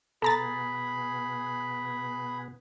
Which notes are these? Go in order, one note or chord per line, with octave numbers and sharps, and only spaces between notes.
B2 B3 G#4 A4 A#5 B5 A6